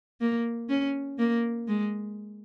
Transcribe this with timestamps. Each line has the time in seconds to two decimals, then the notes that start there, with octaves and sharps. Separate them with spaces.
0.21 A#3
0.69 C#4
1.19 A#3
1.68 G#3